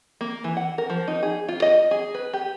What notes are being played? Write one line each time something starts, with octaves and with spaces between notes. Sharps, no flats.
A#3
E3
F#5
A#4
F3
D#4
G#4
F4
D#5
G#4
B4
G4